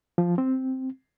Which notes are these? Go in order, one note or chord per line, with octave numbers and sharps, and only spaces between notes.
F3
C4